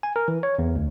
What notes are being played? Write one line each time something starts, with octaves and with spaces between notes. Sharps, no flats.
G#5
A#4
E3
C#5
E2
D2